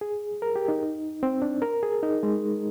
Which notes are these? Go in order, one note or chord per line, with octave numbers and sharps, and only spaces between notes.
G#4
A#4
G4
D#4
C4
D4
A#4
G#4
D#4
G#3